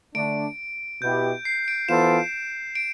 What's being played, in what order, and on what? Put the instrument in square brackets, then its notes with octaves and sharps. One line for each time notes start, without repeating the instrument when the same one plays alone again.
[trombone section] D3 A3 D4 [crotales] D7
[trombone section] B2 B3 E4 G4 [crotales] G6
[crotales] C7
D7
[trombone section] E3 B3 F4 A4 C5 [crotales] E7
[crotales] D7